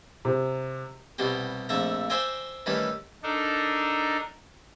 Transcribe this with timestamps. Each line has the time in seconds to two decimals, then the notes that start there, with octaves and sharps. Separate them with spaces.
0.25 C3
1.18 C2 B2 G3 F#4 G4
1.69 A#1 F2 A3 E5 A#5
2.10 C5 D5 E5 G5 G#5 A#5
2.66 D#3 E3 G3 A3 C#4 B4
3.23 D4 D#4 A4 A#4